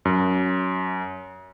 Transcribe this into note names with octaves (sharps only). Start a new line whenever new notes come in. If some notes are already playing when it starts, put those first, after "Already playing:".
F#2